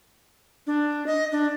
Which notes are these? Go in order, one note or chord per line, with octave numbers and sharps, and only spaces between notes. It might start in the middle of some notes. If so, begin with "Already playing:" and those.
D4
D#5
D4